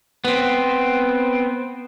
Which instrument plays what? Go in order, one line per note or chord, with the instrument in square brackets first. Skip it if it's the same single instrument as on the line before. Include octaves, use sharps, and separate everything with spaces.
[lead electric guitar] B3 C4